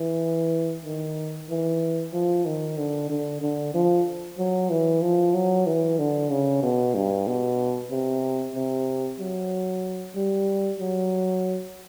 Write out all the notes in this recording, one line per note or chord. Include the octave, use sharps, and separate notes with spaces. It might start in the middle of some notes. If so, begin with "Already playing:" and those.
Already playing: E3
D#3
E3
F3
D#3
D3
D3
D3
F3
F#3
E3
F3
F#3
E3
D3
C#3
B2
G2
B2
C3
C3
F#3
G3
F#3